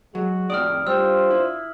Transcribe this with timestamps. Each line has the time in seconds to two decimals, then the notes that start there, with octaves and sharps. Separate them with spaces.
0.15 F#3 G#3 F#4
0.50 F2 A2 D5 D#6 F6
0.87 G3 D4 F4 C5 E6
1.30 E4